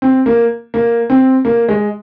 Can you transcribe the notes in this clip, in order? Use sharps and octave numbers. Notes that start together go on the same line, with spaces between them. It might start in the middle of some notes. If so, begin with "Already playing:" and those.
C4
A#3
A#3
C4
A#3
G#3